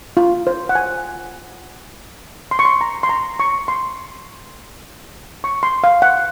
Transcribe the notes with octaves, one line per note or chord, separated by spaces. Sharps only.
F4
C5
F#5
G#5
C6
C#6
C6
A#5
C6
A#5
C#6
C6
C#6
C6
F5
F#5